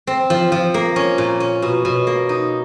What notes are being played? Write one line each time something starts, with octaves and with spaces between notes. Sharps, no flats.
C4
F3
F3
A#3
C#4
A#2
C#4
B2
B2
A#3
D#4